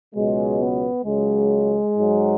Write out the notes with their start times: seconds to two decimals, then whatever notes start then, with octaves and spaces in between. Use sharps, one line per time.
0.13 C#2 B2 F#3 G#3
0.58 B3
1.04 C#2 C#3 F#3 G#3
1.97 G#2 F#3